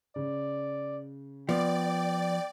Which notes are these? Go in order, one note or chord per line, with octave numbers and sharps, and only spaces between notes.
C#3 D5
F3 B3 D5 G5